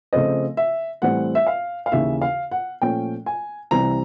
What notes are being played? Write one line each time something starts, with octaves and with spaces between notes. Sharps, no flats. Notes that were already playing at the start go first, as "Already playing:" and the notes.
C#3 F3 A3 C4 D#5
E5
A2 E3 G3 C4 F#5
E5
F5
F5
D#2 C#3 E3 E5
F5
F#5
A#2 F3 A3 C#4 G5
G#5
C2 C3 E3 A#5